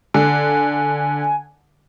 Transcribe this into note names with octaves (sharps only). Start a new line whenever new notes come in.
D3 G#5